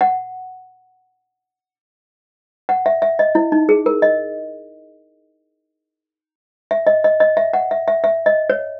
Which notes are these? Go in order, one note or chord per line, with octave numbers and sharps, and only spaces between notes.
F#5
F#5
E5
E5
D#5
E4
D#4
G#4
A#4
D#5
E5
D#5
D#5
D#5
E5
F#5
E5
E5
E5
D#5
C#5